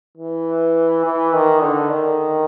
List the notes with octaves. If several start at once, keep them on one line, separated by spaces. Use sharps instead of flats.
E3
E3
D#3
D3
D#3